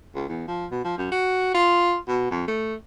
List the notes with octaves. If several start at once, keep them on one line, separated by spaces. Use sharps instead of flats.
C#2
E2
F3
B2
F3
F#2
F#4
F4
B2
F2
A3